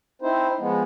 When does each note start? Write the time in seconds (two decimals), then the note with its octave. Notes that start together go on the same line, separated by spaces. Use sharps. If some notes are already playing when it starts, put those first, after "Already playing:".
0.22 C4 D#4 E4 C5
0.59 F3 G#3 B3